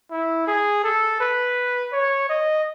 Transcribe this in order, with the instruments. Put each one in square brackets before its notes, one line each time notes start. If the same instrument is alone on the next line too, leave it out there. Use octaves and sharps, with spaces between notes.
[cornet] E4
G#4
A4
B4
C#5
D#5